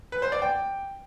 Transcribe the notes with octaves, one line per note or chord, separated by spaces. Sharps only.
B4
C5
D5
G5